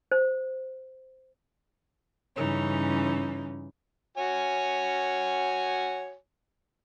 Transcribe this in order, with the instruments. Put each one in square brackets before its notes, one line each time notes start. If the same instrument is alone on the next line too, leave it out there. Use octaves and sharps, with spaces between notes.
[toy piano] C5
[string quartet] G2 C#3 E3 C#4 D#4
[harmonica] F#4 C#5 G#5